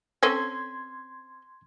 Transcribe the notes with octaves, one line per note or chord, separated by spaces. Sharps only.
C4 C#4 A4 C6 G#6